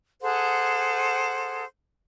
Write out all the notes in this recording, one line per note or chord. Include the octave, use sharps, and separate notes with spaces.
G#4 A4 C5 F#5